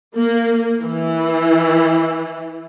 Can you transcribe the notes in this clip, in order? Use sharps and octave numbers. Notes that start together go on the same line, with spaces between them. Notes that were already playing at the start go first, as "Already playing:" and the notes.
A#3
E3